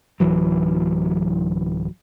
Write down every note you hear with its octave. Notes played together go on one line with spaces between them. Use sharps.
D1 E3 F#3